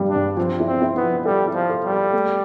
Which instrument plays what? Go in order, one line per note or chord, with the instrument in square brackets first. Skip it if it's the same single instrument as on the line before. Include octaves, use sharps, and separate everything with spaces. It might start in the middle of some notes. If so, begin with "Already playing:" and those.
Already playing: [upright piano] G2 G3
[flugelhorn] D4
[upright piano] G2
[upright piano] F3 [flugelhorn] C4
[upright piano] E4
[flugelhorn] C4
[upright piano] E4
[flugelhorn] B3
[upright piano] F3
[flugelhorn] G3 [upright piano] A4
[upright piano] E4
[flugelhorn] F3
[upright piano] A4
[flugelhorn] G3
[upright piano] A4
A3